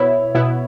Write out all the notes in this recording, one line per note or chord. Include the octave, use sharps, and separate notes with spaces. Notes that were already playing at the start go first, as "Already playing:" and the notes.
Already playing: B2 B3 E4 C#5
B2 B3 E4